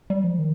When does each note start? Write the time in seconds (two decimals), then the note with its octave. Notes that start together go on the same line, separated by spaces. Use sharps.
0.10 G3
0.24 F3
0.39 D#3